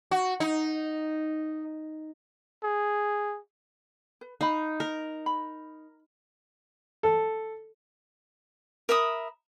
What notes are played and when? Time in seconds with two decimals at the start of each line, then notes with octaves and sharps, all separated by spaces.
0.11 F#4
0.40 D#4
2.64 G#4
4.21 B4
4.41 D#4 F5 B5
4.80 A#4
5.26 B5
7.03 A4
8.89 A#4 E5 B5 D#6